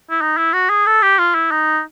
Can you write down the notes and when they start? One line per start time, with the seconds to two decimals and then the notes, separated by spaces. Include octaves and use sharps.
0.10 E4
0.22 D#4
0.37 E4
0.53 F#4
0.70 G#4
0.87 A4
1.02 G4
1.19 F4
1.35 E4
1.51 D#4